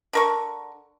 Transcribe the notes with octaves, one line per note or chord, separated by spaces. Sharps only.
D3 A#4 C#6